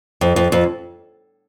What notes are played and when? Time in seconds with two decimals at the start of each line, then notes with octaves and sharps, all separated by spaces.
0.21 F2
0.36 F2
0.52 F2